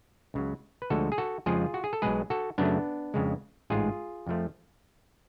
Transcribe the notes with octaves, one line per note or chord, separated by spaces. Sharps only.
C#2 C#3 F#3
B4
D2 D3 F3 G#3 F#4 A4
G#4
F#4 A4
F2 C#3 F3 G#3 F4 G#4
F#4
G#4
A4
B1 B2 G#3 G#4 B4
F#4 A4
F#2 C#3 F#3 A3 B3 D4
F2 C#3 G#3
A1 G#2 G#3 F4 G#4
F2 F3 A3